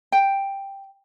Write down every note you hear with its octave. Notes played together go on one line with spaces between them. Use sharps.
G5